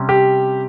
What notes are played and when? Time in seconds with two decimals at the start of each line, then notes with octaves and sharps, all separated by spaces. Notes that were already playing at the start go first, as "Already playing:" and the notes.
Already playing: C3 G3 C#4
0.09 G4